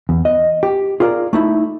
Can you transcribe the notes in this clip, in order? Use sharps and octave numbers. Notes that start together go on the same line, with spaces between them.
E2
D#5
G4
F4 G#4 A#4 D5
A3 D#4 E4